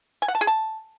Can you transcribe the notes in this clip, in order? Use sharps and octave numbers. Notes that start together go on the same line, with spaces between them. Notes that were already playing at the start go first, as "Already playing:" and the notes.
G#5
F#5
A5
G#4
A5